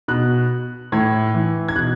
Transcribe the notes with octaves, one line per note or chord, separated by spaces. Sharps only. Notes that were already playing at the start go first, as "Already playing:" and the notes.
B2 F#6
A2 G#6
E3
G#6
B2 F#6